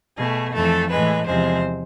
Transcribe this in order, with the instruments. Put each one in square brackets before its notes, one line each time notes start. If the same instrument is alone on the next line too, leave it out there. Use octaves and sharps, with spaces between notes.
[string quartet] B2 A3 G#4
F2 E3 A3 A4
A2 E3 G#3 B4
E2 C3 F3 G#3 C5